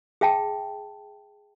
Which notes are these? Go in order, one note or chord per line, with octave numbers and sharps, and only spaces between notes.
G#4 E5 G5 A5